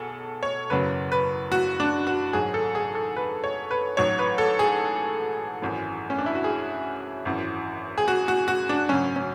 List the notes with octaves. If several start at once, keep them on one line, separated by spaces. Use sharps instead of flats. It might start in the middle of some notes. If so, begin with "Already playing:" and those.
Already playing: B1 B2 G#4 A4
C#5
F#1 E2 C#3 F#3 B4
B4
F#4
D4
F#4
G#1 G#2 F#3 G#4
A4
G#4
A4
B4
C#5
B4
A1 G#2 F#3 C#5
B4
A4
G#4
G#1 F#2 E3
C#4
D4
E4
F#4
G#4
G#1 F#2 E3
G#4
F#4
F#4
F#4
D4
G#1 F#2 C#3 F#3 C#4
C#4